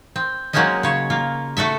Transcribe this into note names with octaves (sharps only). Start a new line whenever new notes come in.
C4
F#3 G#3 A#3 C4 C#4 D#5
C#3 C#5
A#3 F4
A3 F#4 A4 E5